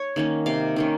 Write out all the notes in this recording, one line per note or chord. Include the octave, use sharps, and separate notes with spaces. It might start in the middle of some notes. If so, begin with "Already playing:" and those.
Already playing: C#5
D#3 A#3 C#4
C3 F5
D#3 A#3 C#4